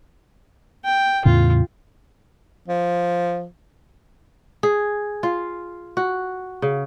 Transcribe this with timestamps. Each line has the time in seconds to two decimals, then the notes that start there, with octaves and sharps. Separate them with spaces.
0.84 G5
1.25 E2 A2 C#3 F4
2.68 F3
4.63 G#4
5.23 F4
5.97 F#4
6.62 C#3